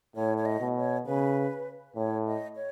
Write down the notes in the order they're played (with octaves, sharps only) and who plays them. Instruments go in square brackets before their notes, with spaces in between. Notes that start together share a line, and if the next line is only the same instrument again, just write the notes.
[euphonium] A2 [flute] C#5
[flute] C#5
D#5
[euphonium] B2
[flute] C#5
[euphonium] C#3 [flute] B4
[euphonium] A2 [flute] C#5
[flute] D#5
C#5